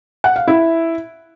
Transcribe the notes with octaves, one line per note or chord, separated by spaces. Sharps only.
F#5
F5
E4